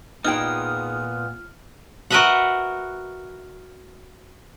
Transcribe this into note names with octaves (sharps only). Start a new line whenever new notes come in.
A#2 B3 D#4 F4 G#4 G5 F6
F#4 A#4 B4 D#5 E5 F#5